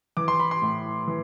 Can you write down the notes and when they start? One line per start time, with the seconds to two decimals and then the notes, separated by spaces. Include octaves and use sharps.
0.17 E3 D6
0.28 C6
0.40 B5
0.51 C6
0.62 A2
1.08 E3